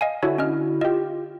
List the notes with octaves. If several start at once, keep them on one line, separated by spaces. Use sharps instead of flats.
D#5 F5 G#5
D3 E4 F#4 C#5
C#4 D#5 F6
F4 G4 D#5